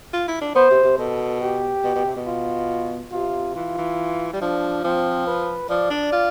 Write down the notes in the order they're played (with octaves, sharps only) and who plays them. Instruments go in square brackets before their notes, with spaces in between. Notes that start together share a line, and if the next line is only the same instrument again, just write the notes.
[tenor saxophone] F4
E4
D4
[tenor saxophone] B3 [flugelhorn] C5
[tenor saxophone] C3
C3
[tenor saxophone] B2 [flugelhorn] A4
[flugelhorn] G4
[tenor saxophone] B2
B2
C3
B2
[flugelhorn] F4
[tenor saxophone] C3 [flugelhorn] F4
[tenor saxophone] E3 [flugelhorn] F4
[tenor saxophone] E3
G3
[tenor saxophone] F3 [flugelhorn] D4
[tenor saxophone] F3 [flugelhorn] C4
[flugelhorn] B4
[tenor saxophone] F3 [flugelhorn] D5
[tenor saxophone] D4
F4